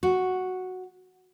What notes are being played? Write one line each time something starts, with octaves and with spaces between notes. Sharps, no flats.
F#4